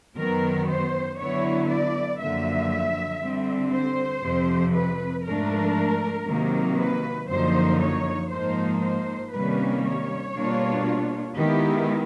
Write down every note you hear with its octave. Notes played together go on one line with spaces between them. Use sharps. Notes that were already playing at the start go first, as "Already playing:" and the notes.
F#2 D#3 F#3 B3 A#4
C5
D3 F#3 B3 E4 C#5
D5
F#2 D3 F3 A#3 E5
D3 G3 C4
C5
F2 C3 F3
B4
G#2 F3 A3 D4 A#4
C3 D#3 F#3 A#3
B4
F#2 D3 F3 A#3 D#4 C5
C#5
G#2 F3 A#3 D#4 C5
C5
C3 D#3 G3 A#3 C#4 B4
C#5
B2 G3 A#3 D4 F4
D#3 G#3 B3 E4 G4